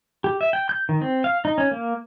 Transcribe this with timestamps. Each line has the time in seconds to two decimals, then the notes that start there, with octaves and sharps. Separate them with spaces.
0.24 G4
0.41 E5
0.53 G5
0.69 G6
0.89 D#3
1.01 C4
1.24 F5
1.45 D#4
1.58 C#4
1.71 A#3